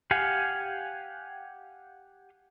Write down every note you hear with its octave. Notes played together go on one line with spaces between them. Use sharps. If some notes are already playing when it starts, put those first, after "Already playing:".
G4 F5 F#5 G#5